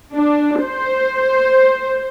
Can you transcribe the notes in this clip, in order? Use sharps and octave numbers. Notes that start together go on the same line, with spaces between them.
D4
C5